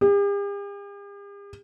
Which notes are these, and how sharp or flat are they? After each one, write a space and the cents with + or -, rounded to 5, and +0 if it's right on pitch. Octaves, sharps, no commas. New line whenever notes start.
G4 +45